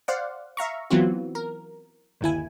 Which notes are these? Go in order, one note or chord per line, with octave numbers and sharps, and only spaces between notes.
C5 D5 F5 F#5
E5 F5 A#5 C#6
E3 F#3 B3 C4 F4 F#4
A#4
G1 D#2 E4 G#5